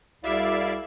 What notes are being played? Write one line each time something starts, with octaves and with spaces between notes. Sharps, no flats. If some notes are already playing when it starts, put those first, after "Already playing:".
C2 E4 F#4 G#4 D5 E5 F5 D6